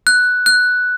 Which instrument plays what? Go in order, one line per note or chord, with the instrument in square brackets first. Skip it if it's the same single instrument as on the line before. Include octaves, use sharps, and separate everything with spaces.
[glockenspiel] F#6
F#6